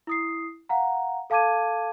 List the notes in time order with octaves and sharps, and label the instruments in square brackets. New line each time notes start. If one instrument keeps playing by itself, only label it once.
[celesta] E4 D#6 C7
F5 F#5 A#5
A4 F5 A5 D6 G#6 D#7